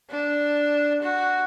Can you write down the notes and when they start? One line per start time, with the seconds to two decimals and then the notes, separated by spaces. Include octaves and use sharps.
0.11 D4
1.02 F#4